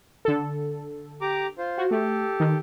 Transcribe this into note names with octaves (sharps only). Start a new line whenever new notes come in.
D3 A4
G4 A#5 D6
F4 C5
F#4
A3 G4 A4
D#3